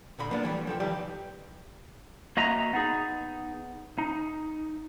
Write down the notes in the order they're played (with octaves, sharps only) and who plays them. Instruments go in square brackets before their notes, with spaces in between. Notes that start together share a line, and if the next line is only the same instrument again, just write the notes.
[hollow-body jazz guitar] A#2 D3 B5
F3 A#3 B3 D4
E3 F3 G3 A3
F3 A4 G5
C#2 D#3 E3 G3 G4 D5
[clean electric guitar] A#3 F#4 D#5 E5 A#5
B3 D#4 G#4
D#4